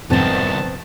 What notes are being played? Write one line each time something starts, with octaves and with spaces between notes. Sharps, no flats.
C2 F2 G#2 D#3 B3 C4 A5